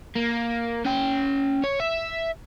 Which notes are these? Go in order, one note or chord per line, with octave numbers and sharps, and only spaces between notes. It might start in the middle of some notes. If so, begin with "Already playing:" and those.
A#3
C#4 G5
C#5
E5